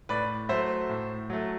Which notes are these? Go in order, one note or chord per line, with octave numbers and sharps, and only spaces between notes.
A2 B4 D5
F#3 A3 C5 E5
A2
F#3 A3